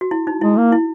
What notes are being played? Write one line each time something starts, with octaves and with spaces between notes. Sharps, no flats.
F#4
E4
D#4
G#3 E4
A#3
E4